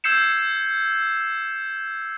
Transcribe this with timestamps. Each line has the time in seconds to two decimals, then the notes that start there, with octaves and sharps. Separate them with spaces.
0.04 E6 G6 G#6 C7 C#7 E7